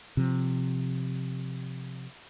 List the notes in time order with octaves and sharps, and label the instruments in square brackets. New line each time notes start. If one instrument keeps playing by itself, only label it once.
[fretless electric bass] C3 F3